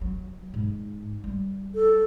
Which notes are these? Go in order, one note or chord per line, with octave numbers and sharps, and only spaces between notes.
F#3
G#2
G3
A4